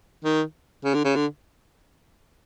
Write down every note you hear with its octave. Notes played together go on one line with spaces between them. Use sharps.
D#3
C#3
D3
C#3
D3